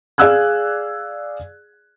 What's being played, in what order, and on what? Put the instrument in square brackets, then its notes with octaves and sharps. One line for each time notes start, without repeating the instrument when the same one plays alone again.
[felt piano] G#4 D5 F5 E6 F#6 G#6